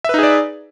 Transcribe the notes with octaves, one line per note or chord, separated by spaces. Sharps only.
D#4 G#4 B4 D5 E5